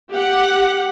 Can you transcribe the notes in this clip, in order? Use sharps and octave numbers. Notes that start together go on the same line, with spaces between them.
G4 F#5